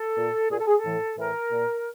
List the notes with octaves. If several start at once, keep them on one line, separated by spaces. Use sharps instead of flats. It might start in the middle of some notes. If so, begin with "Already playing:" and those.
Already playing: A4
A#2
A#2 G#4
A4
G#4
A4
A2 E3
A2 E3 A#4
A#2